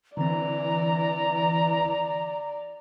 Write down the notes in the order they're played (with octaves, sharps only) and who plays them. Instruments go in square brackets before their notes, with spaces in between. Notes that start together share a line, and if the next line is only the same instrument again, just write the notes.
[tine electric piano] D3 C4 [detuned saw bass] E3 [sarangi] D5 [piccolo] A#5